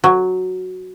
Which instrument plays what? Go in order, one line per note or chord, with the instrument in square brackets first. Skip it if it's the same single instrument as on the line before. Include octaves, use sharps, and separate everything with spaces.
[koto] F#3